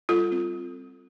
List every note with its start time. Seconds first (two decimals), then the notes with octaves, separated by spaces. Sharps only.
0.09 G3 F4 A4
0.32 C4